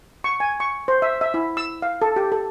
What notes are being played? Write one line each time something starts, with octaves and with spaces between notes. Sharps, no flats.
C#6
G#5
C#6
C5
E5
E5
E4
E6
F5
A4
G4
A4